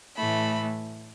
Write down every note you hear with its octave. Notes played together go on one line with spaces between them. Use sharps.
A2 E3 A3 B5